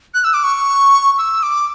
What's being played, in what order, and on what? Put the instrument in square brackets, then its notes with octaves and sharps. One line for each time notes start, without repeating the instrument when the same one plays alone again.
[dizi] F#6
E6
D6
C#6
E6
D6